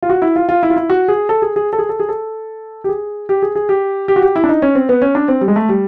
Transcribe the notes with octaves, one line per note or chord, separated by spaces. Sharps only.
F4
F#4
E4
F4
F4
E4
F4
E4
F#4
G#4
A4
G#4
G#4
A4
G#4
A4
G#4
A4
G4
G#4
G4
G#4
G#4
G4
G4
F#4
G4
E4
D4
D#4
C#4
C4
B3
C#4
D4
C4
G3
G#3
A3
G3